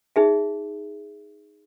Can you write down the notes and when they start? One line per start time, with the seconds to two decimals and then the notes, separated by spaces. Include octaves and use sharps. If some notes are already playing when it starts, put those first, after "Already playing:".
0.16 D#4 G#4 E5